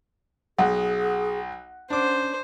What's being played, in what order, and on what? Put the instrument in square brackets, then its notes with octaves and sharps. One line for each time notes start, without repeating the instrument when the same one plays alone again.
[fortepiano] B1 [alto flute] G#4 [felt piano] F#5
[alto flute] C#4 [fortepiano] D4 D6 [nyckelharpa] C5